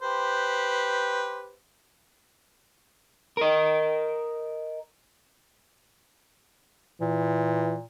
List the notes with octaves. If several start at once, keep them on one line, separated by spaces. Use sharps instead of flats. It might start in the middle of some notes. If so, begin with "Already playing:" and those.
G4 B4 C5
A#4 D#5
A#2 E3